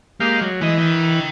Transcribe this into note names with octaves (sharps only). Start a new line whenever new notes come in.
G#3 A#3 G4 F5
F#3
E3 G#3 D#5
D#5 G5